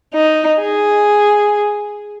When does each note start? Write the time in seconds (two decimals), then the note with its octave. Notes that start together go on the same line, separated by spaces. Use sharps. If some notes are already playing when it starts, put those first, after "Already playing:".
0.14 D#4
0.61 G#4